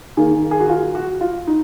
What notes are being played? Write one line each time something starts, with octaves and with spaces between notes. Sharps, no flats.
D#3 A#3 G#4
G#4
F#4
F4
F#4
F4
D#4